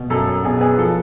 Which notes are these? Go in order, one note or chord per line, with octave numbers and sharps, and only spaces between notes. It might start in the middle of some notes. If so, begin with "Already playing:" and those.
Already playing: B2
F#2 A4
F#2
B2 G#4
B3 G#4
F3 A4